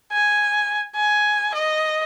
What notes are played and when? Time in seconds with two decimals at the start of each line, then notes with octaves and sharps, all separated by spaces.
0.12 G#5
0.96 G#5
1.54 D#5